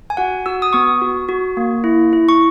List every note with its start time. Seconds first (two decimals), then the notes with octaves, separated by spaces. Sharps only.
0.10 G#5
0.17 F#4 F#5
0.46 F#4 E6
0.62 D#6
0.73 B3 C#6
1.02 F#4
1.29 F#4
1.57 A#3
1.84 E4
2.13 E4
2.29 C#6